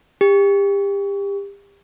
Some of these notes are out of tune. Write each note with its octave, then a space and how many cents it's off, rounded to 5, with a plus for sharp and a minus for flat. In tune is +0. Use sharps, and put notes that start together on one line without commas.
G4 +30